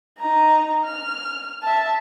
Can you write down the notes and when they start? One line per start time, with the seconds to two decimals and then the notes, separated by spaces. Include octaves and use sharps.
0.19 D#4 A#5
0.85 F6
1.64 E5 A5